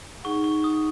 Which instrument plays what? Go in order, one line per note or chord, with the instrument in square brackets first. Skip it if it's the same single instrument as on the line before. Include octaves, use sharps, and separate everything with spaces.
[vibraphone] D#4 G#4 F#5 [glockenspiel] C#6
[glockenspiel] C#6
D#6